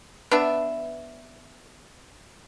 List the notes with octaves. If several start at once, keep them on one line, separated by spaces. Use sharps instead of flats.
B3 D4 E5